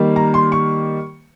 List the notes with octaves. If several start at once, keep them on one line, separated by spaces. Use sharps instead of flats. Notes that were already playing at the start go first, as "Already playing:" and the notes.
Already playing: D#3 G3 A#3
A#5
C6
C#6